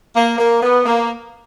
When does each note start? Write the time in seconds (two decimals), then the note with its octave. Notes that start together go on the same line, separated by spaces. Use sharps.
0.15 A#3
0.38 A#3
0.61 B3
0.86 A#3